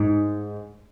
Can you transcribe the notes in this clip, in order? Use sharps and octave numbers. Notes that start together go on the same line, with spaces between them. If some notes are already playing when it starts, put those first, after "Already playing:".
Already playing: G#2